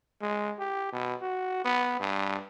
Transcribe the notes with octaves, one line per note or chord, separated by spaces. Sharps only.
G#3
G4
B2
F#4
B3
G2